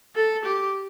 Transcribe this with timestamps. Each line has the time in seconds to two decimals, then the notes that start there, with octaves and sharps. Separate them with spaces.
0.15 A4
0.45 G4